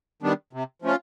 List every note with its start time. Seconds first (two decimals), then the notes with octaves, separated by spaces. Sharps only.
0.22 D#3 G3 B3 D4
0.53 C3
0.82 F3 A3 C#4 F4